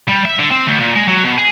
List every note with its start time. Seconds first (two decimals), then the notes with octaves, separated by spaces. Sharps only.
0.08 G3
0.25 E5
0.39 D3
0.52 C4
0.67 D2
0.80 A#2
0.96 G#3
1.08 F#3
1.24 B2
1.38 G#4